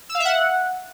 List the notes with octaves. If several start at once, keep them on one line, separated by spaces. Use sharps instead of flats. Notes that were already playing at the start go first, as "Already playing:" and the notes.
E6
F5
E5
F#5